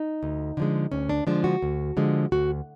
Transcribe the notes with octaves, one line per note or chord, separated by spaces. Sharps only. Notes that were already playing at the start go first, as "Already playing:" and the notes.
Already playing: D#4
D2
D3 F3 G#3
D2 C#4
D4
D3 F3 G#3 D4
F#4
D2
D3 F3 G#3
D2 F#4